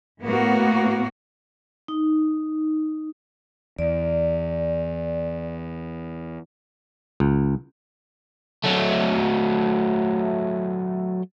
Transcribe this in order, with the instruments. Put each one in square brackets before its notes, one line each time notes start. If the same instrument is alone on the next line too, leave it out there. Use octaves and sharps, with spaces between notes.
[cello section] A2 A#3 B3 F#4
[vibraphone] D#4
[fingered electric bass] E2 [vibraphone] D5
[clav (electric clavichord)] C#2
[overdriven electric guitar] F#3 A3